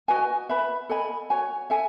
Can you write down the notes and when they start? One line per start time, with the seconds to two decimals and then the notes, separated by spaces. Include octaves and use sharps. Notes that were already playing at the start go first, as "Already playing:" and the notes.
0.08 F#4 B4 D#5 G#5
0.49 B4 E5 B5
0.89 A4 D#5 G#5 B5
1.30 F#4 C#5 G#5
1.70 A4 E5 G#5